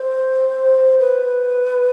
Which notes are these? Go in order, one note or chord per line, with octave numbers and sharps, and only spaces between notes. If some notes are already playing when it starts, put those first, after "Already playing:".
Already playing: C5
B4